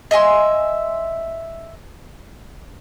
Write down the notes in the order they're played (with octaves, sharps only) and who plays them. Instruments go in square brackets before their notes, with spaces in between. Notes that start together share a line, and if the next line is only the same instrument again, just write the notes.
[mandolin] D#5 E5 G#5 C6